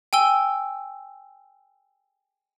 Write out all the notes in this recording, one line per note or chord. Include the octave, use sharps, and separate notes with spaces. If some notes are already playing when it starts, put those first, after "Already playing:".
G5 G#5 E6 G7